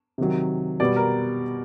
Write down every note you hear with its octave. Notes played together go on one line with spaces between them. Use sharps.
C3 D#3 F#3
B2 G3 B3 D5
A#4